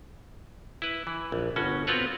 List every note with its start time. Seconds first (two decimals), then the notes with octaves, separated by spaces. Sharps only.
0.82 E4 B4
1.07 E3
1.32 A#1
1.56 G1 B2 C#4 F#4
1.87 B3 C4 F4 F#4 B4 C#5